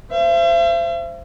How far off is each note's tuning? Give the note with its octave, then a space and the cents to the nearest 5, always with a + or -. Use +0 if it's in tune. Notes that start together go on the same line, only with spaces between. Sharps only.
C5 +0 E5 +45